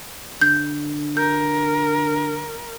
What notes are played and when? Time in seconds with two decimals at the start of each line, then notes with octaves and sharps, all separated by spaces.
0.41 D3 G6
1.17 A#4 G6